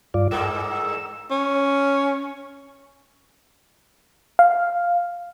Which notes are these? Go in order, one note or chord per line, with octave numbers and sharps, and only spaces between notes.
G2 F4 D5
G2 G#3 A#3 E6
C#4
F5